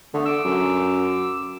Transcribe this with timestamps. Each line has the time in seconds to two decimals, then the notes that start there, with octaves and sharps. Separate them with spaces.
0.14 D3 A3 B3
0.25 D6 E6
0.45 F#2